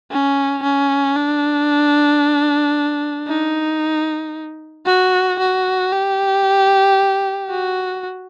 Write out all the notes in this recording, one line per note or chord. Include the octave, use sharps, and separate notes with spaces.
C#4
C#4
D4
D#4
F#4
F#4
G4
F#4